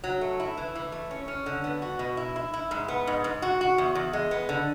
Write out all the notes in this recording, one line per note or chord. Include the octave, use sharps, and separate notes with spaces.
F#3
A3
E4
E3
E3
A3
C#4
C#4
D3
B3
F#4
B2
E4
E4
E4
G#2
B3
G#2
G#2
F#4
F#4
E2
E2
G#3
B3
D3